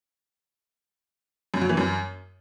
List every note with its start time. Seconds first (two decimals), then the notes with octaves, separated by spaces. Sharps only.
1.54 F#2
1.62 F#3
1.69 E3
1.77 F#2